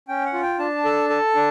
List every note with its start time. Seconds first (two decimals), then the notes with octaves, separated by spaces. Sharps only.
0.08 C#4 G5
0.25 F#5
0.33 F4
0.42 G5
0.59 D4 A5
0.85 A4
1.10 A4
1.35 D4